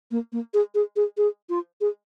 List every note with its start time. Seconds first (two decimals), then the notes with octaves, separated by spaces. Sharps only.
0.11 A#3
0.32 A#3
0.54 G#4
0.75 G#4
0.96 G#4
1.17 G#4
1.49 F4
1.81 G#4